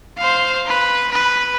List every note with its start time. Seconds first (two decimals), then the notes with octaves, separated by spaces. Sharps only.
0.17 C5 F5
0.67 B4
1.12 B4